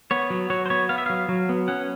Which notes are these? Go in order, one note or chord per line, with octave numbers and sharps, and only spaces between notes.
B3 C#5
F#3
F#3 C#5
C5
B3 C#5
B3 F5
E5
F#3 F5
F#3
B3
C#4 F#5